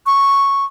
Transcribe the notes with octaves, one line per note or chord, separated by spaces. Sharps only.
C#6